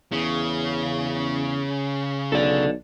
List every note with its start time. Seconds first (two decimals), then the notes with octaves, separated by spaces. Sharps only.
0.12 E2 C#3
2.32 B1 A4 D5